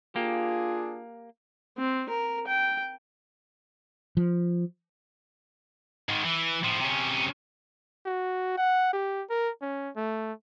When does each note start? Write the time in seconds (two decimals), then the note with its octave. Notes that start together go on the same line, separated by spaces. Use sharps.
0.16 A#3 D4 F4 G4 G#4
1.78 C4
2.09 A#4
2.47 G5
4.17 F3
6.09 G#2 D#3
6.24 E3
6.64 A2 F3
6.80 C3 C#4
8.06 F#4
8.58 F#5
8.93 G4
9.30 A#4
9.62 C#4
9.96 A3